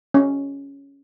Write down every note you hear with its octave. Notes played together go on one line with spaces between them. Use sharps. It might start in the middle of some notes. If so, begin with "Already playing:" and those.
C#4